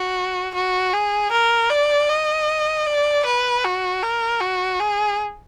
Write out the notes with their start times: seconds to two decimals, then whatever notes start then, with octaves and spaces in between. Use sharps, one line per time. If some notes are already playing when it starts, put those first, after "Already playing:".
Already playing: F#4
0.55 F#4
0.93 G#4
1.31 A#4
1.70 D5
2.09 D#5
2.86 D5
3.25 B4
3.64 F#4
4.03 A#4
4.41 F#4
4.80 G#4